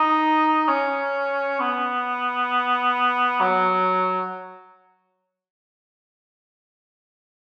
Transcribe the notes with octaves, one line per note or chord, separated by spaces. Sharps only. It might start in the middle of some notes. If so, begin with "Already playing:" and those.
Already playing: D#4
C#4
B3
F#3